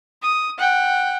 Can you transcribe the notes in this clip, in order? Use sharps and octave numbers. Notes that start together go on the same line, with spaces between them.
D#6
F#5 G5